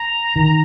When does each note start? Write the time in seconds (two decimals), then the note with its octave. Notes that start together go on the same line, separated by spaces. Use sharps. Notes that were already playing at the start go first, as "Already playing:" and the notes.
Already playing: A#5
0.36 D#3